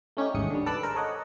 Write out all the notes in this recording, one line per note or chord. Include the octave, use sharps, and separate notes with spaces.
A3 C#4 D#4 G4
A1 D#2 G#2 C#3 D#6 C#7
D3 G3
A4 B4 A5 D6 E6 F#6
G#4 A#4 C5
A4 C#5 D#5 F#5